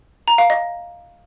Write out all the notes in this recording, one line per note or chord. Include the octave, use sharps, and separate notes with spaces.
A#5
F5
D#5